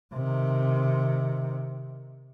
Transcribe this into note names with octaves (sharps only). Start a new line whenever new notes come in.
C3 D#3